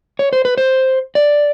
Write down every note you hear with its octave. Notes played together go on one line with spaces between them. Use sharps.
C#5
C5
B4
C5
D5